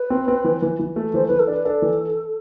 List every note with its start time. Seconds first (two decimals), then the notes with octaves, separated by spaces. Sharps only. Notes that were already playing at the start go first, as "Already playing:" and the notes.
Already playing: B4
0.10 C4
0.28 C4
0.44 E3
0.62 E3
0.79 E3
0.96 A3
1.14 E3 C5
1.27 E3 B4
1.39 A4
1.48 D4
1.53 B4
1.65 D4 A4
1.82 E3